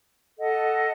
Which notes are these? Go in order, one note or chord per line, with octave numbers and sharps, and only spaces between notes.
A4 D#5 F#5